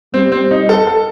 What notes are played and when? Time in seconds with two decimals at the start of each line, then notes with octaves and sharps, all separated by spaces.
0.14 G3 C4
0.32 C4
0.51 D#4
0.69 A4
0.87 A4